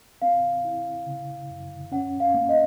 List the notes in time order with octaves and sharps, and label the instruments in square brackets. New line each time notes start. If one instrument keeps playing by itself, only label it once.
[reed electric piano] C4 [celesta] F5
[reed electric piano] E4
C#3
F#2
[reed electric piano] C#4 [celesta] F#5
[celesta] F5
[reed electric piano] A#3
[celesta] D#5